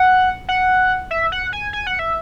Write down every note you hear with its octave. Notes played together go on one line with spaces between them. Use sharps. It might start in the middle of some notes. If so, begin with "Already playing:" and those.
Already playing: F#5
F#5
E5
F#5
G#5
G#5
F#5
E5